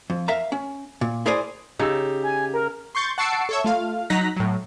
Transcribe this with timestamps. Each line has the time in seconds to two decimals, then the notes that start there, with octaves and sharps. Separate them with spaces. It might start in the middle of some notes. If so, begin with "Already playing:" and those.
0.10 F2
0.28 A#4 E5 F5 A#5
0.52 C#4
1.01 A#2
1.26 E4 G#4 A#4 C5 D5 G#5
1.79 C#3 D#4 G4 E6
2.24 G#5
2.53 A#4
2.95 C6 C#6 G6 A6
3.18 F#5 A5 C#6 E6 C7 D7
3.49 A4 C#5 E5
3.64 A3 F4 F5
4.10 F#3 D#4 A#5 F#6 A#6 B6
4.36 A2 F#3